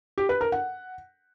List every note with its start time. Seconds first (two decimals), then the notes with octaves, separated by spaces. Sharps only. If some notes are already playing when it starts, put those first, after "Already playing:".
0.18 G4
0.29 B4
0.41 A#4
0.52 F#5